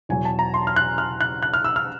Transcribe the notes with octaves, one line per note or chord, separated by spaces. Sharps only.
E2 B2 F#3 G#5
A5
A#5
C6
F6
F#6
F6
F#6
F#6
F6
E6
F6